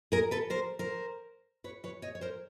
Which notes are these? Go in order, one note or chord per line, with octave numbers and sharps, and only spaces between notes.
G#4 A#4
A4 B4
A#4 C5
A#4 C5
B4 C#5
B4 C#5
C#5 D#5
C#5
A#4 C5